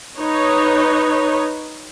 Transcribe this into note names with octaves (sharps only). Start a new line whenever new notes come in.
D#4 B4 C#5